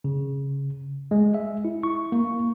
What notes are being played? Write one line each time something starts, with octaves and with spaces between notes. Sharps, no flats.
C#3
G#3
E5
E4
C#6
A#3